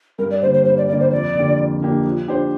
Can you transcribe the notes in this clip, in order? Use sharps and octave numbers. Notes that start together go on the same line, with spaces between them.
G2 A#4
D5
D3 G3 A#3 C5
C5
G2 C5
D5
D3 G3 A#3 D5
C5
F2 D5
D3 A#3 D4 G4
F2
D3 A#3 D4 G4
F3
D4 G4 C5